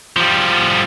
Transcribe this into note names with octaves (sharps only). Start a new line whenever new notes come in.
F3 G3